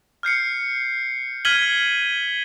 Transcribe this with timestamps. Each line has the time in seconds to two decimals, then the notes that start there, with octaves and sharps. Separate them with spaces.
0.23 F6 G6 C7 C#7
1.45 F6 G#6 B6 D#7 F#7 G7